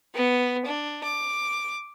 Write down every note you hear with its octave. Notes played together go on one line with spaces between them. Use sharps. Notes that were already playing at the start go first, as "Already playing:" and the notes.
B3
D4
D6